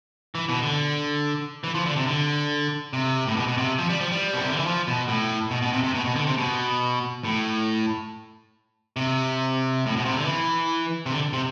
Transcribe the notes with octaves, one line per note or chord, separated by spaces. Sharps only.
E3
B2
D3
E3
F3
D3
C3
D3
C3
A2
B2
B2
C3
F3
G3
F3
G3
B2
C3
D3
E3
F3
B2
A2
B2
B2
C3
C3
B2
B2
D3
C3
B2
A2
C3
A2
B2
C3
D3
E3
C3
D3
C3